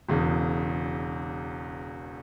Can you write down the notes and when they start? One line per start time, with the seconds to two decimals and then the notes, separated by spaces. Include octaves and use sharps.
0.09 E1 E2 C#3